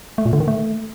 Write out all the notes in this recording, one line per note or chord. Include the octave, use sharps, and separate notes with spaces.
A3
A#2
D3
D#3
A3